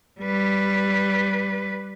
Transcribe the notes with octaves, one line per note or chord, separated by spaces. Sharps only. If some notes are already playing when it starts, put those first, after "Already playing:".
G3 B4